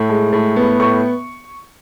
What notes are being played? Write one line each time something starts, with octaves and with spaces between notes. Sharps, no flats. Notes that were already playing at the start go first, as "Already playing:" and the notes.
Already playing: A2
G#3
A2
B3
A2 C#6